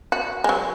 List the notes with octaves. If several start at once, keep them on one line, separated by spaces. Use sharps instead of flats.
F#4
G#3
F#3